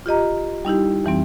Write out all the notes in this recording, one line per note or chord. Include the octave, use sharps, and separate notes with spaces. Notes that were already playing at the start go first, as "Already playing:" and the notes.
F4 G4 D#5 A#5
G3 D#4 E4 G4
F2 E3 G3 C4